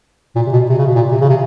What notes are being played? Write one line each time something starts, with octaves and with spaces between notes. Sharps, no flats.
A#2
C3
B2
C3
C#3
B2
A#2
C3
C#3
C3